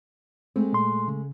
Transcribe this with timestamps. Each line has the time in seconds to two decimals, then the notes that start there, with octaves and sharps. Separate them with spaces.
0.56 G#3 A3 C4
0.73 A#2 C6
1.08 C#3